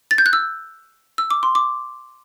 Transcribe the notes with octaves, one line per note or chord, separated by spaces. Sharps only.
A6
G6
F#6
E6
E6
D6
C6
D6